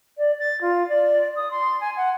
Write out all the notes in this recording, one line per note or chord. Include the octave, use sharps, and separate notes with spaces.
D5
A6
F4
D5
D#6
C6
G#5
F#5